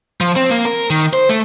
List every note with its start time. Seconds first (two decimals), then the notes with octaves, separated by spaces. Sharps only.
0.21 F3
0.36 C4
0.51 A#3
0.65 A#4
0.90 D#3
1.13 C5
1.29 A3